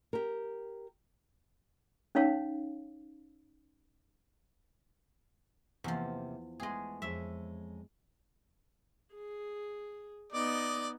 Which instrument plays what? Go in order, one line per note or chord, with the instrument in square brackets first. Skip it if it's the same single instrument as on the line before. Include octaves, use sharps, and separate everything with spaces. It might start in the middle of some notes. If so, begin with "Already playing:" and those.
[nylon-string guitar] G4 A#4
[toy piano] C#4 D#4 C#5 F5 A5
[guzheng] E2 F3 [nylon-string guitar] C3 A#3
[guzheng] G#3 G#4 [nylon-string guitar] A3 B3 G#5
[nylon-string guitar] F2 G#3 C#5 [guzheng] E5
[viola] G#4
[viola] B3 D#4 [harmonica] D5 D#5 D6